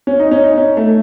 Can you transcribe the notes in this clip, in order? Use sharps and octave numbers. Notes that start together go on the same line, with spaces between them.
C#4
D#4
C#4
D#4
C#4
A3